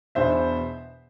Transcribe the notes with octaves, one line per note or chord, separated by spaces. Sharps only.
E2 B2 B3 D4 C5 E5